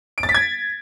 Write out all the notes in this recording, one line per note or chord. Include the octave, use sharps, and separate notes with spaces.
D7
A6
B6
G#6